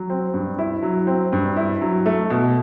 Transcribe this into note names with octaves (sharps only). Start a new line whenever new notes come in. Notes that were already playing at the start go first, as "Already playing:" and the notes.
Already playing: F#3
C4
G2
E4
F#3
C4
G2
E4
F#3
A3
B2